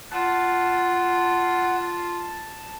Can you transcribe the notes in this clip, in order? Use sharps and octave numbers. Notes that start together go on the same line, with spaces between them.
F4 F#5 A5